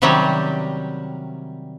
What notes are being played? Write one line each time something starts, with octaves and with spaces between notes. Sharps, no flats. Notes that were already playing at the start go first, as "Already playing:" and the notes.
C3 D#3 F#3 G3 C#4